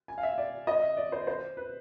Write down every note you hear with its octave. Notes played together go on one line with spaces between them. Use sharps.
G#5
F5
E5
D5
D#5
E5
D5
C5
C5
B4